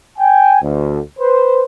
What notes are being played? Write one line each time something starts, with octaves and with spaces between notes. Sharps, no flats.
G5 G#5
D2
B4 C5